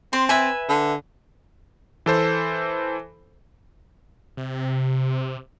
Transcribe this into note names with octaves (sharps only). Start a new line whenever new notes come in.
C4 C6
B4 E5 G#5
D3
E3 A4 C5
C3